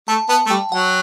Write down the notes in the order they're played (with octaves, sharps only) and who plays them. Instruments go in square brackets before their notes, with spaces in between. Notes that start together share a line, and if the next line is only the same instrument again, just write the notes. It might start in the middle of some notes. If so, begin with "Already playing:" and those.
[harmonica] A3 [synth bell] A5
[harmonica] B3 [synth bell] A5
[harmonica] A3
[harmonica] G3 [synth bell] G5
[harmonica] F#3 [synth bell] F#5